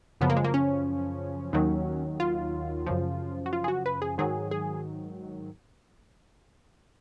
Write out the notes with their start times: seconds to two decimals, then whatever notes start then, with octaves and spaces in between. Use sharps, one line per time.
0.21 F#2 C#3 F3 B3
0.30 A#3
0.37 G#3
0.44 A#3
0.54 C#4
1.53 D#2 D#3 F#3
2.20 F4
2.87 F#2 C#3 F3
3.46 F#4
3.53 F4
3.64 G#4
3.68 F#4
3.86 B4
4.02 G#4
4.18 G#2 D#3 F#3 G#4
4.51 G#4